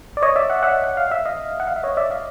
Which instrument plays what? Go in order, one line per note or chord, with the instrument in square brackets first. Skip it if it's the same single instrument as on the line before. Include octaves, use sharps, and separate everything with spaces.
[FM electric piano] D5
C#5 D#5
D5 E5
E5 F#5
E5 F#5
F#5
F5
E5
D#5 F5
F#5
F5
E5
C#5 D#5
D5 E5
D#5 F5